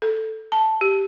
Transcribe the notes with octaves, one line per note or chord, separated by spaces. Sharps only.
A4
A5
G4